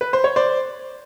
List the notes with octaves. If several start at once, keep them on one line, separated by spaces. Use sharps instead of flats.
B4
C5
C#5
C5 D5